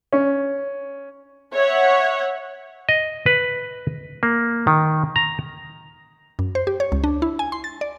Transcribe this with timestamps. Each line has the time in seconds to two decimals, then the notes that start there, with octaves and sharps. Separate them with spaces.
0.13 C#4
1.54 C#5 E5 F#5
2.89 D#5
3.26 B4
4.23 A#3
4.67 D#3
5.16 A#5
6.39 F#2
6.55 C5
6.67 G4
6.80 C#5
6.92 C#2
7.04 D4
7.22 E4
7.39 G#5
7.52 C6
7.64 A6
7.81 D5